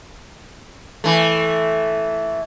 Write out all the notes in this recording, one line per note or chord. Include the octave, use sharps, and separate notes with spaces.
E3 A3